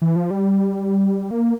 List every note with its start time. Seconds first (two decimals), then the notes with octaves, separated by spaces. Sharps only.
0.02 E3
0.16 F3
0.31 G3
1.31 A#3